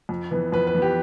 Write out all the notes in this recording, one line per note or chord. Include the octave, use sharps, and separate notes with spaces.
F2
E3 B3
F2 B4
B4
E3 B3
G4